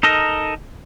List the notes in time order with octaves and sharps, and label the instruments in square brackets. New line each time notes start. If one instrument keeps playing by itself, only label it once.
[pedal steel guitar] D#4 A4 A#4 D#5